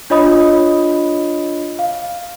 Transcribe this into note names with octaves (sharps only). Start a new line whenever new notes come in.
D4 F4 C#5 D#5 B5 D#6
F5